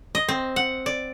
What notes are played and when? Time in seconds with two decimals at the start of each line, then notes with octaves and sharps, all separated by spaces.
0.15 D#5
0.28 C4
0.56 F#5
0.86 D5